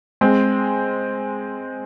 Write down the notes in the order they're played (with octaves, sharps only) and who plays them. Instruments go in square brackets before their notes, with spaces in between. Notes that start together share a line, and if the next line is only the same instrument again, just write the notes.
[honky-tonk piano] G#3 C4